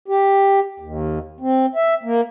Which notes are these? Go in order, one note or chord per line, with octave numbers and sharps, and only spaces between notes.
G4
D#2
C4
E5
A#3